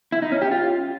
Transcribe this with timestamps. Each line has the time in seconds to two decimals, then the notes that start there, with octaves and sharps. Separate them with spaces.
0.12 E4
0.22 D#4
0.32 C#4
0.42 G4
0.51 F4